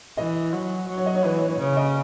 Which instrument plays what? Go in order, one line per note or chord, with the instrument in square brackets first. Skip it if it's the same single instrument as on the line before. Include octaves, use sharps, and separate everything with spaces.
[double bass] E3 [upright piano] D#5
[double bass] F#3
F#3
[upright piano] C#5
D#5
C#5
[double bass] E3 [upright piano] B4
[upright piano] C#5
C#5
[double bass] C#3 [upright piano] C#5
[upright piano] D#5